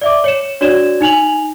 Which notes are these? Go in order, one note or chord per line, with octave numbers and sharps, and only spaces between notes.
D5 E5 D6
C#5 C#7 E7
D4 F#4 C#5 D5 G#6 E7
D#4 G#5 F7 F#7